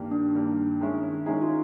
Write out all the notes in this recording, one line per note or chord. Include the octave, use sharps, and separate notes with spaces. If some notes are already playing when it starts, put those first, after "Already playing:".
Already playing: G2 D#3 G3 A#3
D4
G2 D#3 G3 A#3
D#3 G#3 C#4 E4 G#4
D#3 G#3 C#4 D#4 E4 G#4
F4